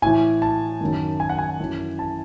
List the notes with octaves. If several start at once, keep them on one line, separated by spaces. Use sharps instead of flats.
A2 E3 G#5
A5
F#2 D#3 F#3
G#5
F#5
G#5
F#2 E3
A5